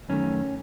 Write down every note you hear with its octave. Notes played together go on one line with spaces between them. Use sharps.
F#2 D#3 A3 C#4